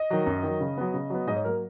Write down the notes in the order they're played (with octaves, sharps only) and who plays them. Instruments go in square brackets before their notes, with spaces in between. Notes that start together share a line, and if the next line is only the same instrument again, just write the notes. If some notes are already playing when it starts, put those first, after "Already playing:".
Already playing: [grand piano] D#5
D#3 F#3
F#2
D#3 F#3
C#3
F#3 B3
C#3
F#3 B3
G#2 D#5
C#5
F#3 A#3 A#4